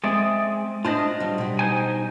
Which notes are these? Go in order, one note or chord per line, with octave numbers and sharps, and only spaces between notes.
G#3 C4 G#4 D5 E5
D4 F4 C5 D#5 A5
F#3 G3
B2 G3
D#4 C5 G#5